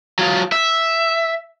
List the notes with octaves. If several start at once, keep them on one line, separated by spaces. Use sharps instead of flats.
F#3 F4
E5